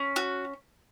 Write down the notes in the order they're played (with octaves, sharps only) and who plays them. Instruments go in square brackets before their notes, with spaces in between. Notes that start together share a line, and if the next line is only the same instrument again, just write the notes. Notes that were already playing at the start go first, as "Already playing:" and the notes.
Already playing: [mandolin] C#4
F#4